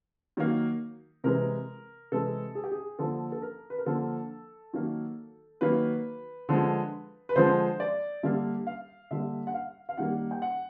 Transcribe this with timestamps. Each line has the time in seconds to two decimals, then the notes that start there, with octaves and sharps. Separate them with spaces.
0.37 D#3 F#3 A#3
1.24 C3 E3 G#3 A#4
2.12 C3 E3 G#3 A4
2.55 G#4
2.64 G4
2.72 G#4
2.99 D3 F3 A#3 A4
3.32 A4
3.42 A#4
3.70 B4
3.78 A#4
3.86 D3 F3 A#3 A4
4.73 D#3 F#3 A#3
5.61 D#3 F#3 A#3 B4
6.49 D3 F3 G#3
7.29 B4
7.36 D3 F3 G#3 C5
7.80 D5
8.23 D3 G3 A#3 E5
8.67 F5
9.11 D3 G3 A#3 E5
9.47 F#5
9.54 F5
9.89 F5
9.97 D#3 G3 A#3 F#5
10.31 G5
10.42 F#5